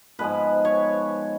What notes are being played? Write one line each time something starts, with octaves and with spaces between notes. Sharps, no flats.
G#2 F3 G#3 B3 B4
C#5